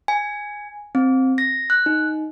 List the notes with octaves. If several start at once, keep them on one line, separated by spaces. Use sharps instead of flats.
G#5
C4
A#6
F#6
D#4